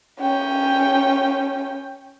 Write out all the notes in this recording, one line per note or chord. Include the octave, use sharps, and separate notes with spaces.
C#4 G5